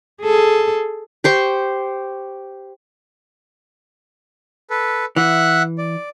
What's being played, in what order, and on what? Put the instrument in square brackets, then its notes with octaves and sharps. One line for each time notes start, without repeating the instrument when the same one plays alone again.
[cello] G#4 A4
[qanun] G4 C5 C#6
[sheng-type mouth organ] A4 B4
[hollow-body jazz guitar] E3 [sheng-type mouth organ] E5 F#5 F#6
[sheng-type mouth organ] D5